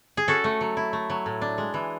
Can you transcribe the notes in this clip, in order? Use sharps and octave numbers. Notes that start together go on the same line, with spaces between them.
G#4
C#4 F#4 A4
A3
F#3
E4
A3
F#3
A2
D4
G#3
E3